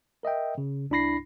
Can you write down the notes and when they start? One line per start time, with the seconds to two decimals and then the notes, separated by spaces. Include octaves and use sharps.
0.23 A#4 D#5 E5 G5
0.58 C#3
0.90 C2 D4 E4 B5 A#6 C7